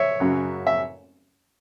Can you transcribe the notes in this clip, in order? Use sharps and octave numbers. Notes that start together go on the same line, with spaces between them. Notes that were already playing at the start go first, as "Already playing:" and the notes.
Already playing: C#5 E5
F#2 C#3 F#3
E5